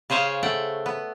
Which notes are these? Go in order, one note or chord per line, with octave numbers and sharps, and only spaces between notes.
C#3 G#4 C5 C#5 F5
A3 F#5 G5
B3